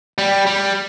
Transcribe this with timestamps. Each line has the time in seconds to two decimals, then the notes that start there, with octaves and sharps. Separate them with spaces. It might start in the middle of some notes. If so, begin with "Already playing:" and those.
0.18 G3
0.47 G3